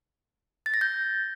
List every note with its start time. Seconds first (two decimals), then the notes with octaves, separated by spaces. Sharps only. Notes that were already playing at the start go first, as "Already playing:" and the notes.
0.66 A6
0.74 A#6
0.81 G6